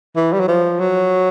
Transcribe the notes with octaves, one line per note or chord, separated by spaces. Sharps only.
E3
G3
F#3
F3
F#3